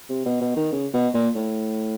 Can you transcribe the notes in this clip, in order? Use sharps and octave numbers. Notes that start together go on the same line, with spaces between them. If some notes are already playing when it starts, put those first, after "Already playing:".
C3
B2
B2
D#3
C#3
B2
A#2
A2